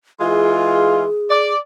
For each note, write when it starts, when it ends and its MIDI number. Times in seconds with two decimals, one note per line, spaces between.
0.20 1.04 52
0.20 1.04 56
0.20 1.04 65
0.20 1.53 68
1.31 1.57 74